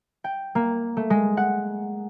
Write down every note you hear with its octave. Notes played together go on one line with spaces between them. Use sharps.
G5
A#3
A3
G#3
F#5